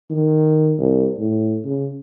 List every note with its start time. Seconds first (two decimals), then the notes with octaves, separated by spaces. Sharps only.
0.10 D#3
0.79 C2
1.18 A2
1.64 C#3